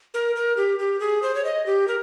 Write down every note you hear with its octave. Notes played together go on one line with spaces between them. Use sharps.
A#4
A#4
G4
G4
G#4
C5
C#5
D#5
G4
A#4